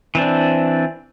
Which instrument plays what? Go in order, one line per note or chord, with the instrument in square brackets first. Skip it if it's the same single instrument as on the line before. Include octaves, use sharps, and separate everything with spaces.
[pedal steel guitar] E3 C4 D4